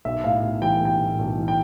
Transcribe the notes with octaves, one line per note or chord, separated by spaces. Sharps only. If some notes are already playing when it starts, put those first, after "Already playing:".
B1 E5
A2 F5
B1
E3 G5
B1 G5
A2
B1
E3
G5